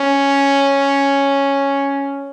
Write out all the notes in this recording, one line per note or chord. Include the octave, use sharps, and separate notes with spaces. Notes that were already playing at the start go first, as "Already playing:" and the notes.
Already playing: C#4